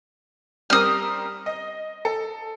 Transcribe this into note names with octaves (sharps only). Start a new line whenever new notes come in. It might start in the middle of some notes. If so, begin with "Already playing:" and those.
G3 C4 A#4 D#6 F6
D#5
A4